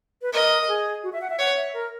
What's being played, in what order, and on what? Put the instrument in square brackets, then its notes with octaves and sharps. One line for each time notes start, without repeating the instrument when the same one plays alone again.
[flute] B4
[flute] A#4 [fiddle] D#5
[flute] G#4
F#4
E5
F#5
E5
[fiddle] C#5 [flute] F#5
[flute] E5
A#4